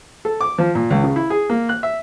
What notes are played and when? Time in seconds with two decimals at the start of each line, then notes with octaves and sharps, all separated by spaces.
0.25 A4
0.41 D6
0.58 F3
0.75 A#2
0.90 C#2
1.04 C#3
1.16 E4
1.30 G#4
1.50 A#3
1.69 F#6
1.83 E5